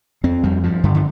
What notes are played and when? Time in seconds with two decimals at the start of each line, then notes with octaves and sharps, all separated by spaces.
0.24 F2 C4
0.43 F2 G3
0.64 G2 F3
0.84 G2 D3
0.94 D3